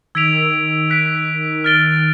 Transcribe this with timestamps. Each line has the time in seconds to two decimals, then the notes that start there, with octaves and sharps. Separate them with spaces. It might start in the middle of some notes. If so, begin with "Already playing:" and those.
0.15 D#3 E6 G#6 B6 D7 F7
0.90 F#6 B6 D7
1.64 F6 A6 D7 G7